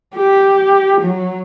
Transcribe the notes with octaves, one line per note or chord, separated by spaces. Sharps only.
G4
F#3